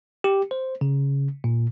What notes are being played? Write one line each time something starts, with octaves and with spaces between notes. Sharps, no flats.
G4
C5
C#3
A#2